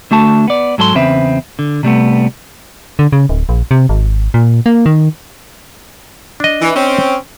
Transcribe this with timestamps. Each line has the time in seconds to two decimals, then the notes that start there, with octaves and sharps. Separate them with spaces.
0.11 D3 A3 F#4 A5
0.48 B3 D5
0.78 G#2 F#3 A4 A#4 C6
0.95 E2 C#3 C4 B4 E5
1.59 D3
1.83 C3 G3 A3 B3
2.99 D3
3.13 C#3
3.29 D1
3.49 A#1
3.71 C3
3.89 G#1
4.34 A#2
4.66 A#3
4.86 D#3
6.40 D4 D#5
6.62 E3
6.76 C4 C#4